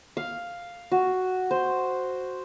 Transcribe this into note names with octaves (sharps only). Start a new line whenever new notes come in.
F5
F#4
C5